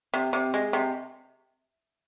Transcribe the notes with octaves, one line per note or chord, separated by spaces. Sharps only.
C3
C3
G#3
C3